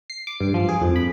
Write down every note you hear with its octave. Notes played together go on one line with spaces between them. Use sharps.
C7
D6
G2
F3
G#4
F2
B5